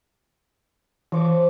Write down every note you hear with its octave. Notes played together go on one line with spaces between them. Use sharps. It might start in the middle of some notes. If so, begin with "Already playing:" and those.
E3 F3 C#6 D6